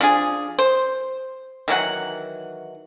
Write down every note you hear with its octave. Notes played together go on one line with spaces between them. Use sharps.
F3 D4 G#4
C5
D#3 E3 F#3 F#5